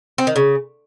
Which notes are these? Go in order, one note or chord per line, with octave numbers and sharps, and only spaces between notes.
C4
D#3
C#3